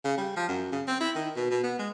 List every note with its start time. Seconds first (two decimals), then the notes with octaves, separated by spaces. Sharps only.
0.05 C#3
0.18 G3
0.36 F3
0.48 F#2
0.72 C#3
0.87 C4
1.00 E4
1.15 D#3
1.36 B2
1.51 B2
1.63 B3
1.79 G#3